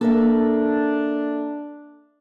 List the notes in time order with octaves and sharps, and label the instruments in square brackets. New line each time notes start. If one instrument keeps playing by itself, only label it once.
[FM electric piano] A#3 [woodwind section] D4 [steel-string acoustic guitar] A4 A#4 E5